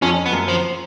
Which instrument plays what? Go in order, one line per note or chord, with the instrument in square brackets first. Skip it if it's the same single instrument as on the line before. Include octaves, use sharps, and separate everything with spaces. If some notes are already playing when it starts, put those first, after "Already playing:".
[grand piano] F2 [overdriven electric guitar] C#4
[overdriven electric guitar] B3
[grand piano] F#2
[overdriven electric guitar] F3